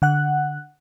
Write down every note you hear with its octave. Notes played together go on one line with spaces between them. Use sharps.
D3 F#5 F#6